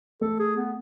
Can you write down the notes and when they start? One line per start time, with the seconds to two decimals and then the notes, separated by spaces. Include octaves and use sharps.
0.21 A3 A4
0.39 G#4
0.57 B3